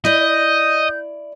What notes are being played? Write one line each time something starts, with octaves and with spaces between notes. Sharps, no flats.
E4 D5 D#5 G6